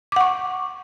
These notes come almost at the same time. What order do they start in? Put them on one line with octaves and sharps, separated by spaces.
D6 F#5 C#6